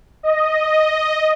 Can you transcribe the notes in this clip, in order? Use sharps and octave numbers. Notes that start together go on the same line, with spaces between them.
D#5